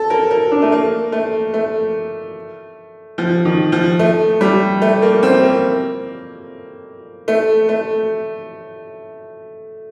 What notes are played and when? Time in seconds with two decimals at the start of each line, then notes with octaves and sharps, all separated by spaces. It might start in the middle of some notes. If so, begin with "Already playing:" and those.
Already playing: A4
0.10 A#4
0.31 A#4
0.51 D4
0.62 A3
0.72 A#3
1.12 A3
1.54 A3
3.18 F3
3.45 D#3
3.72 F3
3.99 A3
4.41 G3
4.82 A3
5.02 A#3
5.23 C4
5.43 A#3
7.28 A3
7.69 A3